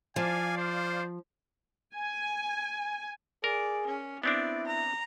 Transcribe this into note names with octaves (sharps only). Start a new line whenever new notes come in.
F3 D5 F5 G#5
C5
G#5
G#4 A#4 D5
C#4
B3 C4 D4 E4 D5
A#5